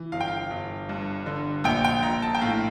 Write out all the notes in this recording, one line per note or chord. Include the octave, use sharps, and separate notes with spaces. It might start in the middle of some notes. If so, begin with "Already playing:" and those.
Already playing: E3
G1 F5
G5
F5
G1
G2
D3
A#1 G5
G5
A#1 A#5
A5
G5
A2 F5